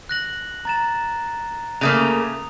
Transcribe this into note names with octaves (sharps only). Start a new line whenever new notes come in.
F#6 A#6 F#7
A#5 A6 E7
C#3 A3 A#3 D#6 F7